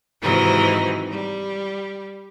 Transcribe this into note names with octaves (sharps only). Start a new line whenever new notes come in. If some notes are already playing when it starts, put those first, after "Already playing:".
G#2 C3 D#3 E3 F#3 D#4
G3